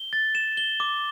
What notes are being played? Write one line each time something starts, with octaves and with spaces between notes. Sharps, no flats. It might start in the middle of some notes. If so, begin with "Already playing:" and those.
Already playing: G7
A6
E7
G7
D6